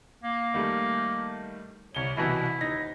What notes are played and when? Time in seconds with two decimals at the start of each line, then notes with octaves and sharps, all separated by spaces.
0.24 A#3
0.54 D#3 G3 A3
1.95 C2 C#5 G7
2.17 C2 B2 E3 E4
2.61 D#1 D#4 A#6